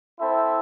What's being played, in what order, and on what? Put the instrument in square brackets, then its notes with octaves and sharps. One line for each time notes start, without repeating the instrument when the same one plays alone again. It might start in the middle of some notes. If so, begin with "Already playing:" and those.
[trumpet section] C4 E4 A4 C5 E5